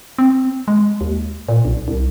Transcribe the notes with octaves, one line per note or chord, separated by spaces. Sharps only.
C4
G#3
D#2
A#2
B1
C2